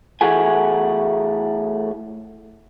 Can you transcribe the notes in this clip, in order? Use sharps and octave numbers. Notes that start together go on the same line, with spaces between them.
A2 E3 A3 F#4 G#4 G#5